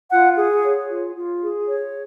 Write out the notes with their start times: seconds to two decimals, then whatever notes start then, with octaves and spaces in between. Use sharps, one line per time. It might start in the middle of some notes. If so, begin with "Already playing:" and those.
0.11 F4 F#5
0.37 G#4
0.64 C#5
0.90 F4
1.16 F4
1.42 G#4
1.67 C#5